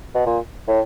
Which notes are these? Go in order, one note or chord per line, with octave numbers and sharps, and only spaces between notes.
B2
A#2
A2